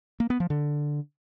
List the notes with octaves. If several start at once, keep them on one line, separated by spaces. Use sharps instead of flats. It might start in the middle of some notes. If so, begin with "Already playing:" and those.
A#3
B3
F3
D3